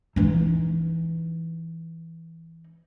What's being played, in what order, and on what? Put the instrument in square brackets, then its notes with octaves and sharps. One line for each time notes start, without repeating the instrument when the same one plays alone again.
[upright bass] E3 D#4